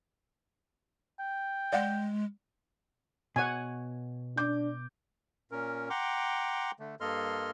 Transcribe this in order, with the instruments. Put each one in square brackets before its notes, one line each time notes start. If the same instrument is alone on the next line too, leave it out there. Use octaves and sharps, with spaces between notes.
[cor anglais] G5
[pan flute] G#3 [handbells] D5 F5 F#5
[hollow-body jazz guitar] B2 C#5 [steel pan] F#5 G#5
[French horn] D4 [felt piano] D6 G6
[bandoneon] A#2 C#4 A#4
F#5 G5 A#5 C6 D6
D3 A3
G2 A#3 A4 D#5 C6 F6